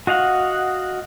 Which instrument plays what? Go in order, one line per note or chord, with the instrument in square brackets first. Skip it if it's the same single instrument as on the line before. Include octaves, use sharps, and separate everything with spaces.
[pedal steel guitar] F#4 D#5 F5 F#5